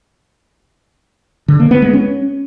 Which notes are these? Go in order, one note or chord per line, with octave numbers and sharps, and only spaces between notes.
D3
A#3
B3
G#3
C#4